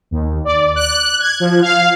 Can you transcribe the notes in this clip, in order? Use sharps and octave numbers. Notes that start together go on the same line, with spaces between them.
D#2
D5
F#6
G#6
F3
F5